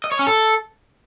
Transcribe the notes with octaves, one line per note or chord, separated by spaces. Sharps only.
D#5
C#5
C#4
A4